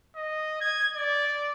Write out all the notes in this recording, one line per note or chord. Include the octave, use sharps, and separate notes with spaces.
D#5
G#6
D5